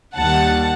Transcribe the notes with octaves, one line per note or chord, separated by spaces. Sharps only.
D#2 D#3 G3 F#5 A5